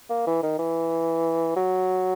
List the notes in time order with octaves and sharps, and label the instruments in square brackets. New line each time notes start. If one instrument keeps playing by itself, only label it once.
[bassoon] A#3
E3
D#3
E3
F#3